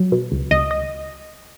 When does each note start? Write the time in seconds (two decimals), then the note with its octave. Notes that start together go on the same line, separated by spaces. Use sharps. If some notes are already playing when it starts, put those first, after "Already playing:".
Already playing: F#3
0.12 B2
0.32 C#2
0.51 C#2 D#5
0.71 D#5